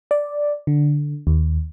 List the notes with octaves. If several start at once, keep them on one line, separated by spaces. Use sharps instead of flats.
D5
D3
D#2